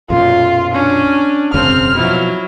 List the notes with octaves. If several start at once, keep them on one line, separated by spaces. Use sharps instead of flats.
B1 F#2 A#2 F4
C#4 D4
E1 F#2 C#3 C4 F6
B2 F3 F#3 E4